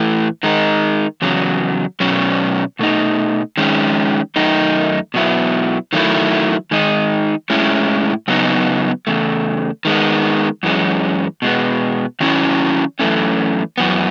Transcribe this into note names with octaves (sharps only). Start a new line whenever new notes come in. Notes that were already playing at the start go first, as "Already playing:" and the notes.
Already playing: A2 E3 A3
D#3 G#3 D#4
E2 C#3 F#3
B2 F#3 C#4
B2 A3 D#4
D#3 G#3 C#4
F#2 D#3 A3 D#4
B2 F#3 B3 E4
D#3 F#3 A3 E4
D#3 G#3 D#4
A2 G#3 C#4 E4
C#3 F#3 B3 D#4
E2 C#3 A3
D#3 G#3 B3
F#2 E3 G#3 C#4
B2 G#3 B3
D#3 F#3 C#4 E4
F#2 C#3 E3 A3 C#4
F#2 E3 B3